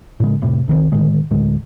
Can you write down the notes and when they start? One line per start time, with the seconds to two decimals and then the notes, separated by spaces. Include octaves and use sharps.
0.20 A2 C#3 G#3
0.42 F1 A2 C3
0.68 C2 D#3 F3 C4
0.92 A2 D3 D#3 G#3
1.31 D2 A2 G#3